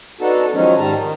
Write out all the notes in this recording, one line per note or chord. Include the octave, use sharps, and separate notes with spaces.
B3 D4 D#4 F#4 A4 A5
D#3 F3 F#3 G#3 C#4 D#4
G#2 D#3 G3 A5 A#5
D#3 D#4